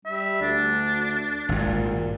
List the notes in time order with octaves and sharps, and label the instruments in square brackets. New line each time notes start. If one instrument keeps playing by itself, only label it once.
[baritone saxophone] G3 [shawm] E5
[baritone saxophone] D2 [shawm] D4
[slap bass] G#1 G2 [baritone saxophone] A#2